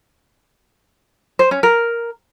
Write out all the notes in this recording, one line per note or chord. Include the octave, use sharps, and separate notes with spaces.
C5
C#4
A#4